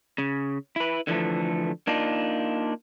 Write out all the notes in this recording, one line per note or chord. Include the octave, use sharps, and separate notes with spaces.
C#3
E4 B4
D3 E3 F3 A3
A#3 D4 D#4 F4